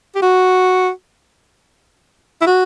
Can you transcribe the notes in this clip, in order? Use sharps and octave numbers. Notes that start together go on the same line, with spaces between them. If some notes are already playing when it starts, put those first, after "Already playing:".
G4
F#4
E4
F#4